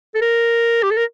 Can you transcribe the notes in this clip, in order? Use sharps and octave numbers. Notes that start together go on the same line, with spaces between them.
A4
A#4
G4
A4
A#4